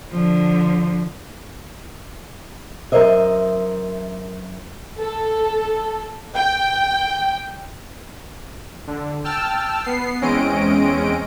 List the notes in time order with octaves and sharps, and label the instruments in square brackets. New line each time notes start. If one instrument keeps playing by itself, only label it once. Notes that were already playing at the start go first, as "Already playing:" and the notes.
[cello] D3 F3
[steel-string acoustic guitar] F#2 A#4 C5 D#5 E5
[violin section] A4
G5
[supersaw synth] D3
G5 A5 E6 F6
B3 C7
E2 G#3 C4 C#4 D#5 D7